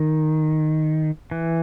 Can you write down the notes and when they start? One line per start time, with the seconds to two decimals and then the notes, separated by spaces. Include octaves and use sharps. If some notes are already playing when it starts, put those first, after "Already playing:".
Already playing: D#3
1.31 E3